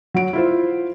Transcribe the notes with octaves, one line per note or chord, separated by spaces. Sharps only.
F#3 D7
E4 F4 C5